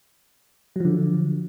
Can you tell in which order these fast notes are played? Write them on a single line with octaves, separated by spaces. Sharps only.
F#3 F3 D3